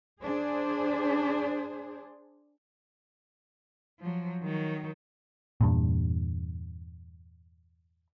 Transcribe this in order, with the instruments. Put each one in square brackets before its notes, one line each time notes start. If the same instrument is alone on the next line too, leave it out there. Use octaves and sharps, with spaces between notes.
[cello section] D4 G#4 C5
[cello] F3 F#3
D#3 F#3
[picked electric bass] E2 G2 A#2